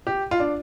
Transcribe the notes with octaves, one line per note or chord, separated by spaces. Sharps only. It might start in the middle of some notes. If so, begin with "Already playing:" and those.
G4
F4
D4